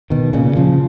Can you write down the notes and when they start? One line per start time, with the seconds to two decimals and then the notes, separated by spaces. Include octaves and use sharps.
0.10 B2 D#3
0.33 A#2 C#3
0.56 C#3 F3